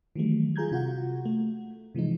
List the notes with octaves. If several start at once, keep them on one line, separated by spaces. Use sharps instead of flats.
D#3 E3 F#3 G3 A3
F4 G#4 A#5 G6 G#6
C3 F4 F#4 F#5
A3
C3 E3 F3 G#3 D#4